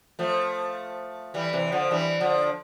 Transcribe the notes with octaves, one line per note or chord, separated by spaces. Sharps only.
F3 A3
E3 G3
C3 E3
D3 F3
E3 G3
D3 F3